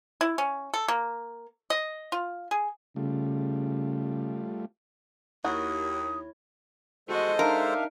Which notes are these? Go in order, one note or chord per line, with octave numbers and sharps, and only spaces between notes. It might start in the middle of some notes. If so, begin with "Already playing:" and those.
E4
C#4
A4
A#3
D#5
F4
G#4
C#3 G3 A3 F4
D#2 E4 F#4 A#4 C#5 D#6
G#3 F#4 A4 C5 D#5
D4 D#4 A#4 E5 F5